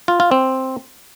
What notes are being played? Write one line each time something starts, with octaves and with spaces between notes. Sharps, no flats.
F4
F4
C4